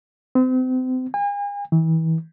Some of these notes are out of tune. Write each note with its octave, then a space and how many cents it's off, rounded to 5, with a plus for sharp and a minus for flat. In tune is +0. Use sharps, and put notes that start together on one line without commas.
C4 -35
G#5 -40
E3 -35